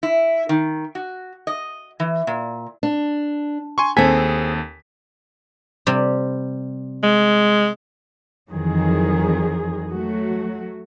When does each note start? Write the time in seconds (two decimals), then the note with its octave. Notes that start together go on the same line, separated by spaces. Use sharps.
0.03 E4
0.49 D#3
0.95 F#4
1.47 D#5
2.00 E3
2.27 A#2
2.83 D4
3.78 G#5 C6 C#6
3.97 D#2 C4 G#4 A4 G#5 B6
5.87 C3 G3
7.03 G#3
8.50 F2 D#3 E3 F#3 G#4
9.92 F#3 A3 F#4